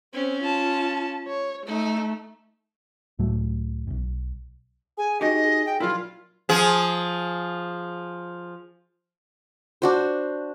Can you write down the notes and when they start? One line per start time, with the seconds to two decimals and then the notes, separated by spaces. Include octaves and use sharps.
0.14 C4 C#4
0.43 F4 A5
1.27 C#5
1.66 A3 D#4
3.19 C#2 A2 F#3 A3
3.87 D1 B1
4.98 G#4 G#5
5.21 D#4 F#4 G4 D#5
5.45 G#4
5.66 G5
5.80 A#2 F#3 E4 F4
6.49 F3 G#4
9.82 D4 F#4 C5